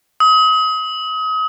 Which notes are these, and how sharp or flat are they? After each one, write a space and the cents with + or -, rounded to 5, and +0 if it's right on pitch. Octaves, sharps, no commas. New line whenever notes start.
D#6 +35